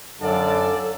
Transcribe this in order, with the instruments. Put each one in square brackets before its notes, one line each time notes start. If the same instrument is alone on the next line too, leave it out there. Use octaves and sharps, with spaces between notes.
[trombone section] F#2 D3 [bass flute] A4 [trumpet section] D5 F5 A5